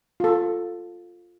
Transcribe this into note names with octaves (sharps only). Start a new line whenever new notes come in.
F4 A4